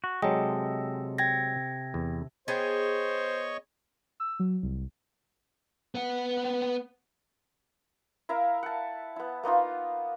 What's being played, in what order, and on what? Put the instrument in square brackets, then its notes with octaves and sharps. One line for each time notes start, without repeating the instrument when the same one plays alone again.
[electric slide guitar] F#4
[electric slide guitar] C3 A4 D#5 [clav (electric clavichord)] F#3 G#3 [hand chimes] G5
[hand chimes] G5 G#6 A#6
[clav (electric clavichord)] E2
[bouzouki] B3 G#4 G5 [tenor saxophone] C5 [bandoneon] C#5 D#5 C#6
[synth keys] E6
F#3
C2
[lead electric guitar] B3 F#5
[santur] E4 A#4 E5 F5
F#5 A5
B3 E4
A#3 B3 D#4 F4